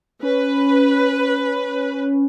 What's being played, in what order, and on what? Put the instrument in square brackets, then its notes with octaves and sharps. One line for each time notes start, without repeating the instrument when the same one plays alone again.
[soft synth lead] C#4 [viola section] B4